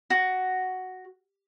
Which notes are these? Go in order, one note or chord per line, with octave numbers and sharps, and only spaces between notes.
F#4